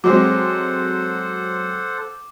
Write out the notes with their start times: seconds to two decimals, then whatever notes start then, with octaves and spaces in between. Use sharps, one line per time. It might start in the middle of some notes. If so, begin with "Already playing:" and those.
0.04 F#3 G#3 C4 A4 C5 F#5 D6